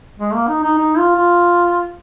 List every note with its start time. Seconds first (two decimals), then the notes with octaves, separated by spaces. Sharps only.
0.19 G#3
0.34 A#3
0.48 D#4
0.64 D#4
0.78 D#4
0.98 F4
1.16 F4